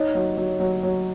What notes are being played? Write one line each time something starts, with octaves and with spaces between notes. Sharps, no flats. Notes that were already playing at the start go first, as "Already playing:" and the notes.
Already playing: D#4 C#5 D#5
F#3
F#3
F#3
F#3